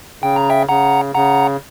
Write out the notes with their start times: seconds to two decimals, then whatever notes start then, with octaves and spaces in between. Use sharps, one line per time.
0.23 C#3 G5
0.36 A#5
0.50 E5 G5
0.69 C#3 F#5 A#5
1.15 C#3 F#5 A#5